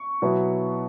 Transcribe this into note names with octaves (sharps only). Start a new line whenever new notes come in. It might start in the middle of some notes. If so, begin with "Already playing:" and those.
Already playing: C#6
B2 F#3 B3 E4